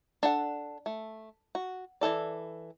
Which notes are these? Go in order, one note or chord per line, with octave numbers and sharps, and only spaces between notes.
D4 A4 F#5
A3
F#4
E3 F3 A4 D5